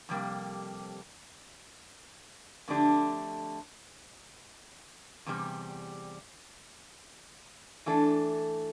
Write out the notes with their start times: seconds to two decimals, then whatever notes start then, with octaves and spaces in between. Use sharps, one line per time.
0.09 F2 C3 G3 A#3
2.68 F2 D3 A3 D4 G4
5.26 E2 C3 G3
7.86 E3 A3 D4 A4